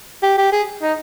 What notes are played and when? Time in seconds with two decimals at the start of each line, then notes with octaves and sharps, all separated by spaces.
0.23 G4
0.38 G4
0.52 G#4
0.82 D#4